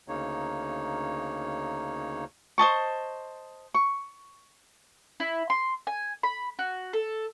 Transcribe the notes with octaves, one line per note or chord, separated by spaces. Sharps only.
D2 C#3 A#3 D#4 C#5
C5 D#5 A5 C#6
C#6
E4
C6
G#5
B5
F#4
A4